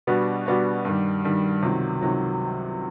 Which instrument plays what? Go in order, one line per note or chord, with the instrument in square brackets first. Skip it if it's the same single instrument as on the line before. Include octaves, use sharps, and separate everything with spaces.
[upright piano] B2 G3 B3 D4 F#4
B2 G3 B3 D4 F#4
G2 D#3 G3
G2 D#3 G3
C#2 C3 D#3 F#3
C#2 C3 D#3 F#3